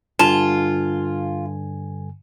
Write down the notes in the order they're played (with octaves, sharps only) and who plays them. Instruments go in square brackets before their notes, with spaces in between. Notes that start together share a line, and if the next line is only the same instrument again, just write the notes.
[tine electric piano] G2 D3 G#5 [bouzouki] F4 [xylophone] A5